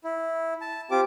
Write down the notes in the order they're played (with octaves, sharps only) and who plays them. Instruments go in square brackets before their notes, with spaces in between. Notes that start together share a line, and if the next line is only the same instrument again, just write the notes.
[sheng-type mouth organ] E4
A5
[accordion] C4 G4 [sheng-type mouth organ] F4 D6